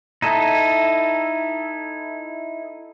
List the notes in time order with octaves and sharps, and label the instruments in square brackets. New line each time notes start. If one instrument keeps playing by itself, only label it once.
[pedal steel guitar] D#4 E4 A4